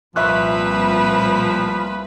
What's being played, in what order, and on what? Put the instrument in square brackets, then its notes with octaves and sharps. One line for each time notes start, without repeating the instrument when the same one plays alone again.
[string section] C2 A#2 [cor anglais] F3 [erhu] B4 [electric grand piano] E5 C#6 F#6